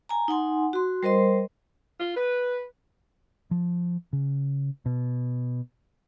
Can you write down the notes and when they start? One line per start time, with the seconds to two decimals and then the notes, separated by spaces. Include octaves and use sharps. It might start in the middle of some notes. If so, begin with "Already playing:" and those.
0.09 G#5 A#5
0.28 D#4 F#5 G#5 C6
0.73 F#4 C6
1.03 G3 A#4 C5 D#5 C6
2.00 F4
2.16 B4
3.51 F3
4.13 C#3
4.86 B2